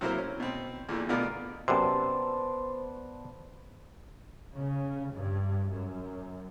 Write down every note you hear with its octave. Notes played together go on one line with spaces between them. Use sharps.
C3 F#3 A#3 E4 A#4 C5
C#4
B2 C4
E2 A#2 D3 E3
D2 B2 B3 F4 A#4 D5
F#2 C3 B3 C5 D5 A5 C6
C#3
G2
F#2